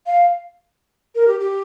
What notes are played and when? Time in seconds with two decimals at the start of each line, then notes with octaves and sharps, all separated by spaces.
0.06 F5
1.15 A#4
1.28 G4
1.40 G4